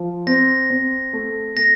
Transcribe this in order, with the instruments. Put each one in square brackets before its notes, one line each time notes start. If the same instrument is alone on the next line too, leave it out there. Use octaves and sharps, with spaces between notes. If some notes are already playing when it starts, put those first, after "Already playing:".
Already playing: [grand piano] F3
[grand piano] C4 [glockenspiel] A#6
[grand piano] C4
A3
[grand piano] A3 [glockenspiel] A#6